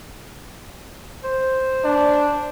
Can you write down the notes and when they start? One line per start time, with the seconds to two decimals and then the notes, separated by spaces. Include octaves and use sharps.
1.24 C5
1.84 D4